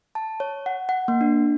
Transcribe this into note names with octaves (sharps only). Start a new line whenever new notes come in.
A5
C#5
F#5
F#5
A#3
D4